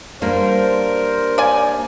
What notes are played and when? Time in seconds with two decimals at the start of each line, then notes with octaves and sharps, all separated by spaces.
0.22 G3 A#3 D4 A#4 C5
1.38 D5 G#5